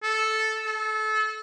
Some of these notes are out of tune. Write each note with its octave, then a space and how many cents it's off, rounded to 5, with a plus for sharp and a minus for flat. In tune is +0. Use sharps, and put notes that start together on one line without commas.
A4 -5
A4 -30